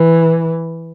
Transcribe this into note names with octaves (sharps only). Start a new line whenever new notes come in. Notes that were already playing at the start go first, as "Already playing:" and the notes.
Already playing: E3